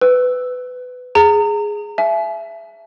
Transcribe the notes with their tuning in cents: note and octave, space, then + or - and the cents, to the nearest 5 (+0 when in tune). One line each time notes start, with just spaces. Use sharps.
B4 +20 E6 +0
G#4 +0 A#5 -30 D#6 +0
E5 +20 G#5 +45